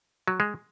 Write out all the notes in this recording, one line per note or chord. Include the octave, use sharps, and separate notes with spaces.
F#3
G#3